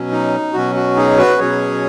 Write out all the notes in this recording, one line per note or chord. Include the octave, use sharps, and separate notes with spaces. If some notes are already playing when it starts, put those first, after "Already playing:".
Already playing: B2 F#3 C#4
D#4
B2 F#3 C#4 F#4
F#4
D#4 G#4
F#4 B4
B2 F#3 C#4 G#4 C#5